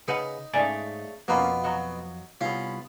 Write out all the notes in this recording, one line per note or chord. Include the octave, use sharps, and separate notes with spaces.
C#3 D#4 B4 F#5
G#2 C#3 A3 D5 G#5
F2 B2 A#3 B3 C#4 F4
F#3 F#4 D#5
C2 B3 C#4 F4